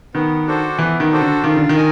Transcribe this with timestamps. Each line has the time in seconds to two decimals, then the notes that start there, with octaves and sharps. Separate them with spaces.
0.15 D#3 B3
0.47 D4 F#4 A4 C5
0.79 E3 B3
1.00 D#3
1.11 D4 F#4 A4 C5
1.21 D3
1.44 D#3 F4
1.56 D3
1.69 D#3
1.76 A#4 D#5 G#5